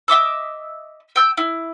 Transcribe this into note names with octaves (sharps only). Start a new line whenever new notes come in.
D#5 E5 D6 E6
G5 E6 G6
E4